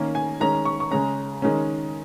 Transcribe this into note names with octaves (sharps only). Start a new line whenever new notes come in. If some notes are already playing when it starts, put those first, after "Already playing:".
Already playing: D#3 A#3 C#4
G#5
D#3 G#3 C#4 A#5
C#6
C#6
C#3 G#3 C#4 A#5
D#3 G#3 C#4